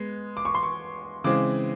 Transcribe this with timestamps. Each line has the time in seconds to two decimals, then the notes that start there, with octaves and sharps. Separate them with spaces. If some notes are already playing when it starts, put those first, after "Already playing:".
Already playing: G#3 B3
0.37 D6
0.45 C#6
0.55 C6
0.63 C#6
1.24 C#3 E3 G#3 C4 D6